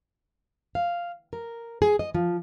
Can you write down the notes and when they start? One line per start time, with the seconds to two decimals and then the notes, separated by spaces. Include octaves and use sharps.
0.75 F5
1.33 A#4
1.82 G#4
1.99 D#5
2.14 F3